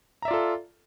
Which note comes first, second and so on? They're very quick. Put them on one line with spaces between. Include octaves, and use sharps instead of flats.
A#5 E5 D5 F4 A4